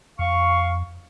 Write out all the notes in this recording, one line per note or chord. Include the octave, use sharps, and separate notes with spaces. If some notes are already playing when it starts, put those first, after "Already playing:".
F2 F5 C#6